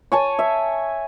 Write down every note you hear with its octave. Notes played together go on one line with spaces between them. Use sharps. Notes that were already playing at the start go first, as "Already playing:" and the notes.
C#5 G#5 A5
E5